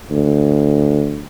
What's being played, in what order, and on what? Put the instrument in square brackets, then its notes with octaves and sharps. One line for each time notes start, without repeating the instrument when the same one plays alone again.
[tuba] D2